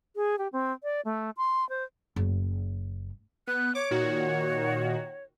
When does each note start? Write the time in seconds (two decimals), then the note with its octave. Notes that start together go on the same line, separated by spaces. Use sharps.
0.16 G#4
0.38 G4
0.53 C4
0.83 D5
1.05 A3
1.37 C6
1.69 C5
2.16 F#1
3.47 B3 F#6
3.75 C#5 D6
3.91 A#2 D#3 F#4